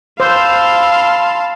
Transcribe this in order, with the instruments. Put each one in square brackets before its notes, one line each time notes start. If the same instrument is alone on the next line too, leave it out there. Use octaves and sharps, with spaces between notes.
[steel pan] C5 [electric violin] F5 A5 [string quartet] B5 C6 F6 [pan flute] E6